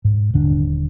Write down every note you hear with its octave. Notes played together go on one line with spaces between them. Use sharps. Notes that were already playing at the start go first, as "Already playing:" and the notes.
G#2
D#1 D3 D4